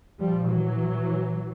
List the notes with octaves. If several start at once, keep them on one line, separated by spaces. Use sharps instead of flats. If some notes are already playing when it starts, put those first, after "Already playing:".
A#2 F3 G3
E3 F#3